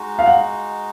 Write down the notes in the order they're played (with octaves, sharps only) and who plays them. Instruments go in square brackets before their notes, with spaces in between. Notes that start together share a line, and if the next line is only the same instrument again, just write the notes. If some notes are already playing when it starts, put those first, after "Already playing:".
Already playing: [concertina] G#3 D#4 F#4
[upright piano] F5
F#5